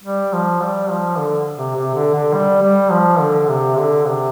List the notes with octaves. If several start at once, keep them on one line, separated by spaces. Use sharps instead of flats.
G3
F3
G3
F3
D3
C3
C3
D3
D3
G3
G3
F3
D3
C3
D3
C3